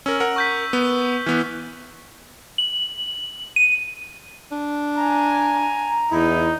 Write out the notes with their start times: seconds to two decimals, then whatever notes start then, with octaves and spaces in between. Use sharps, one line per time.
0.06 C#4 A#4 E6 F#7
0.20 A#4 F#5
0.36 C#6 G6 B6
0.73 B3 G7
1.26 E3 B3 F6
2.58 F#7
3.56 D#7
4.52 D4
4.96 G#5 A#5
6.12 E2 D#4 E4